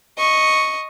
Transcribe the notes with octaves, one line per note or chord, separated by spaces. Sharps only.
D#5 C#6